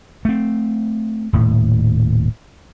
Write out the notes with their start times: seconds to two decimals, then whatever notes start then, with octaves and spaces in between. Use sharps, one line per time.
0.25 A3 C4
1.33 D#1 A2